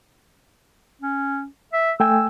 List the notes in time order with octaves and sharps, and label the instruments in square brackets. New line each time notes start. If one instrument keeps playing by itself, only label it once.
[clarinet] C#4
E5
[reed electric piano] A3 G5 G#5 [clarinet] E6